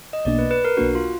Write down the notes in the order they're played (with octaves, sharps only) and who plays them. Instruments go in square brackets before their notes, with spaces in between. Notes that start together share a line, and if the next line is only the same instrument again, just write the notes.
[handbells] D#5
[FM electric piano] B1 B2 A#3 D4 [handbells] D5
[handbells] B4
B4
A#4
[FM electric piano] B1 B2 A#3 D4 [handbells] F#4
[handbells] F4